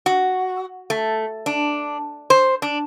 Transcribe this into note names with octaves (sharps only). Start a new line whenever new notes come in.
F#4
A3
D4
C5
D4